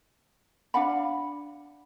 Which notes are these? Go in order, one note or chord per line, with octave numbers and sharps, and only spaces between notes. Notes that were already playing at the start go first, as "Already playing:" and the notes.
D4 F5 F#5 B5